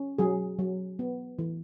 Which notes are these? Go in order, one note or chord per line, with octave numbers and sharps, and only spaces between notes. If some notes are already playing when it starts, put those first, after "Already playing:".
Already playing: C#4
F#3 G#4
F#3
B3
E3